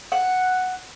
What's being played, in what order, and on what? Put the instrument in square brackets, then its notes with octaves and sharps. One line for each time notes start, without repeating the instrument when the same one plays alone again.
[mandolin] F#5